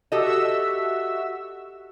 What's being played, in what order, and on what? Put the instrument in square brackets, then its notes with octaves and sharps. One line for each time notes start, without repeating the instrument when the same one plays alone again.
[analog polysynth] F#4 E5 E6 [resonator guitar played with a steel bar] G4 A4 D#5